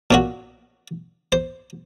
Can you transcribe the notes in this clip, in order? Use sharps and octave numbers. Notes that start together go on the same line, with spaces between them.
A#2 C#4 F#4
C5